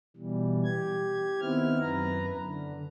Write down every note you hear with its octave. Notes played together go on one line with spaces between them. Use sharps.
B2 E3 G3
G4 G#6
D#3 B3 C4 E4 F6
F#2 B4 A#5
D3